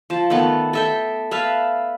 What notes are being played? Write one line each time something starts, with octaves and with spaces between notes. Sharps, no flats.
F3 A5
D#3 A3 B3 A5
A4 E5 G5
B4 E5 F5 A5